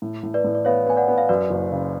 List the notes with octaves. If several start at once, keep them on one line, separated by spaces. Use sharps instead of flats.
A2
A2
B4 D5
A2
D5
B3 C#5 F5
B3 G#5
D5 F#5
B3
F5
F#2 B4 D5
F#1
C#3